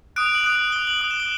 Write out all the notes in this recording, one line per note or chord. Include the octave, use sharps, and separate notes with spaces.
D#6 F#6 D7
F7
F#7
D#6 F#6
D#6 F#6 G7
F#7
D#6 F#6 F#7
E7
G7